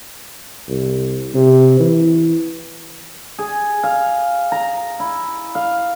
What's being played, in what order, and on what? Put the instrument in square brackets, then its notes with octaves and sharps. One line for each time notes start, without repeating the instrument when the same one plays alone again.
[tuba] C2
C3
E3
[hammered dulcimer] G#4
F5
A#5
E4
F5